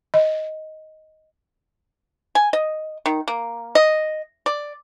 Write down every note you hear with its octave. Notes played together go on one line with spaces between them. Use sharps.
D#5
G#5
D#5
D#3
A#3
D#5
D5